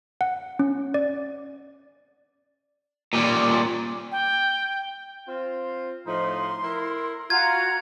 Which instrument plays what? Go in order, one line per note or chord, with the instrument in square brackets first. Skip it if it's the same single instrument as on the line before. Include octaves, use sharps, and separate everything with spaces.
[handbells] F#5
C#4
D5
[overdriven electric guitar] A#2 G3
[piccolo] G5
[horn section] C4 F4
[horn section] A2 F3 D#4 [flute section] C6
[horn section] E4 A#4
[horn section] F4 [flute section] F#4 F#5 A#5 [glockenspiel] G#6